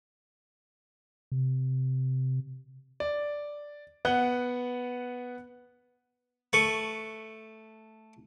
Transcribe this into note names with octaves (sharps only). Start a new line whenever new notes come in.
C3
D5
B3 F#5 F#6 G7
A3 B4 C#6